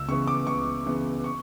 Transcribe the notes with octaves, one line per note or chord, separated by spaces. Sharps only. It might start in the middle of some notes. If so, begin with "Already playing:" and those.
Already playing: C#2 E6
C#3 E3 B3 C#6
D6
C#2 C#6
C#3 E3 B3
C#6